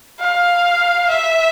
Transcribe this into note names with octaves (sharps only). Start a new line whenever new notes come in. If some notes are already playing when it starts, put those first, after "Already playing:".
F5
E5